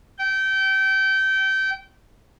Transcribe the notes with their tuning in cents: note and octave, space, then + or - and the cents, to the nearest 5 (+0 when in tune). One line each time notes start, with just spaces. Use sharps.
G5 -25